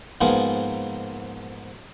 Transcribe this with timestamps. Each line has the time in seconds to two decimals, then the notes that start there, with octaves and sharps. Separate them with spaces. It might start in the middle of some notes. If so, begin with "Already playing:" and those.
0.21 G#2 F3 A#3 B3 F4 G#4